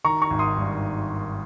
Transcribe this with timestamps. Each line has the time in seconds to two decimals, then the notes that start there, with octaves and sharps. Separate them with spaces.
0.04 D#3 A#5 C#6
0.22 A#5 C#6
0.30 G#1
0.39 C6 D#6
0.57 G2